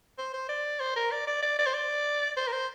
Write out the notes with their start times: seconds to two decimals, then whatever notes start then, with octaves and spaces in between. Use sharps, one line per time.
0.18 C5
0.34 C5
0.49 D5
0.80 C5
0.96 A#4
1.11 D5
1.27 D5
1.42 D5
1.59 D5
1.66 C5
1.74 D5
2.37 C5
2.47 A#4
2.53 C5